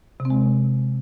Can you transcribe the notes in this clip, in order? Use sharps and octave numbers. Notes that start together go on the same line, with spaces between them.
C3
C4
G#3